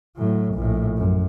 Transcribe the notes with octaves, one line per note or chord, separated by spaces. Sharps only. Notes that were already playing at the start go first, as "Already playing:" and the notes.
A2 F#3
A#1 A2
F#2